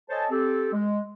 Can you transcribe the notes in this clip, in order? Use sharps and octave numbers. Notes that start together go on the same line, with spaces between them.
A4 C5 C#5 D#5 G#5 A5
C4 G4 A4
G#3